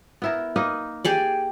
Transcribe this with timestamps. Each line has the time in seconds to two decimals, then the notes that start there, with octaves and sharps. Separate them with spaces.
0.22 B3 E4 A#4
0.56 A#3 D#4 B4
1.05 G4 G#4 D5